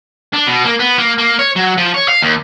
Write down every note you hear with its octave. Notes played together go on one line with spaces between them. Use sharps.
D4
B2
A#3
B3
A#3
A#3
C#5
F#3
F3
C#5
F5
D#2